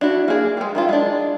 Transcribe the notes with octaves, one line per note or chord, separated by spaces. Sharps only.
D4 E4 F#4
A#3 G#4
G3 G#3
D#3 E4 F4
G#3 D4